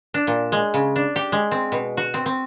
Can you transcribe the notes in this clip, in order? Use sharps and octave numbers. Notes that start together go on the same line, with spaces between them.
D4
A#2
G#3
C#3
D4
G4
G#3
C4
B2
F#4
C4
C4